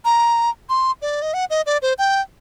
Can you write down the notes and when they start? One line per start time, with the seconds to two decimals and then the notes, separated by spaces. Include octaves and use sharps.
0.05 A#5
0.69 C6
1.02 D5
1.22 D#5
1.34 F#5
1.50 D#5
1.66 D5
1.82 C5
1.98 G5